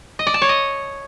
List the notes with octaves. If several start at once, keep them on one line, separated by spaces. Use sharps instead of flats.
D#5
D5
A5
C#5
D#5